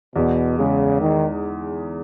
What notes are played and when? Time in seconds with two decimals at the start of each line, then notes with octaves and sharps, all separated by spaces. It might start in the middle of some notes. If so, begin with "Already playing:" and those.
0.16 E2 B2
0.58 C#3 G#3
1.00 D#3 D#4